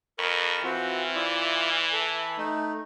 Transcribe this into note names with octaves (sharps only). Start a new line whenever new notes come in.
F2 A#4 B5 C#6
E3 C4 F4 F#4
E4 F4 D5
A4 B5
A3 D#4